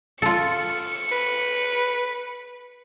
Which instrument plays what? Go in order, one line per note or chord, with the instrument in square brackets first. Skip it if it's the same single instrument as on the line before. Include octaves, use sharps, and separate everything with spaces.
[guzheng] F4 A4 [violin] C#7
[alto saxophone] B4